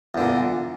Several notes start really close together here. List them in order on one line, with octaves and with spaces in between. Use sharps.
E2 D3 A#2